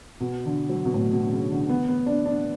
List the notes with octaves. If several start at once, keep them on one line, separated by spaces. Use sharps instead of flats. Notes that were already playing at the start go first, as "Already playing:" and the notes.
B2
D3
F#3
B2
A2
B2
C#3
D3
B3
B3
D4
D4